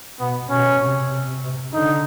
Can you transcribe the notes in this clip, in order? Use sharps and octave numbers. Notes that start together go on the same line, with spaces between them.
B2 B3
B2 C#4
C3
D3 D#4